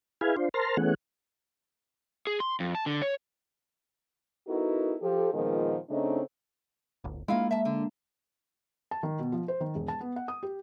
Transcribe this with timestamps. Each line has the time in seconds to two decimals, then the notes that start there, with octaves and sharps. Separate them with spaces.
0.21 E4 G#4 B4 F5 G#5
0.37 D4 F4 C5
0.54 A#4 C5 A5 A#5 C6 F6
0.77 E3 A3 B3 C#4 G#4 F#5
2.27 G#4
2.40 C6
2.60 F2
2.75 A5
2.86 D3
3.02 C#5
4.47 B3 D#4 E4 F#4 A4 A#4
5.02 F3 G4 A4
5.33 A#2 D#3 F3 G#3 A#3 B3
5.90 C#3 A3 C4 D4 D#4
7.04 D1 G1
7.28 G#3 A#3 E4 F4 F5
7.51 E5 A5
7.65 D3
8.91 A5
9.03 D#3
9.19 B2
9.32 F3
9.48 C5
9.60 D#3
9.75 E1
9.88 A5
10.01 B3
10.16 F#5
10.28 D#6
10.43 G4